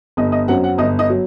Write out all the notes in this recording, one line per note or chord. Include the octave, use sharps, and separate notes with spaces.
G1 D#5
D#5
F#2 F#3 C4 F#5
F#5
G1 D#5
D#5
F#3